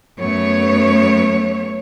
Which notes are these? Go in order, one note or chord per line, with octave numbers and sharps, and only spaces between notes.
F#2 A3 B3 C#5